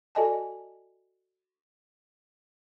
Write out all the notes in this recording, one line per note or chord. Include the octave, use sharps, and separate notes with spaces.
F#4 A4 D5 D#5 G#5 A5